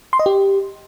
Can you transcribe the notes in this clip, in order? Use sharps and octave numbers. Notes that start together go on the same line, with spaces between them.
C6
D#5
G4